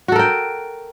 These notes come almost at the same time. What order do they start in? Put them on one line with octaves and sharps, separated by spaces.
F#4 A4 A#4 G5